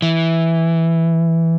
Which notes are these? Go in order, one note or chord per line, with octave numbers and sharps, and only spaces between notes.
E3